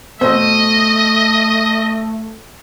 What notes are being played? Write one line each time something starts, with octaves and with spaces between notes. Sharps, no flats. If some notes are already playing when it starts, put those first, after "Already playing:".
B2 A3 C5 D#5 E6